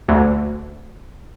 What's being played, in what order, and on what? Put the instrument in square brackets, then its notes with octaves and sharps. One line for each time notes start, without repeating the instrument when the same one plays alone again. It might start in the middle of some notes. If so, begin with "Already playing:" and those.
[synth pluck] D2